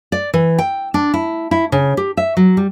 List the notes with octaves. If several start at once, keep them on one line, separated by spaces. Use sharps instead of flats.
D5
E3
G5
D4
E4
E4
C#3
G4
E5
F#3
G3